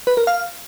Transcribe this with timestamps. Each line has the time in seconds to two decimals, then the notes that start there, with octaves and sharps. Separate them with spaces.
0.07 B4
0.17 A#4
0.27 F5